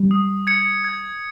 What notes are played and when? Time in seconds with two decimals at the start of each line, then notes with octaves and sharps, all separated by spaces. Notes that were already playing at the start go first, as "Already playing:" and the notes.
Already playing: G3
0.11 D#6
0.47 G#6 C#7
0.84 G#6